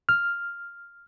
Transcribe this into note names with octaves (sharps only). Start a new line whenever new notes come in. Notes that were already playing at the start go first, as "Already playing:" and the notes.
F6